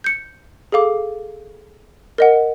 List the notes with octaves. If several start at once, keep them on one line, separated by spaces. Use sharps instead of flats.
G6 C#7
G#4 A4 F5 D6
A#4 D#5 F#5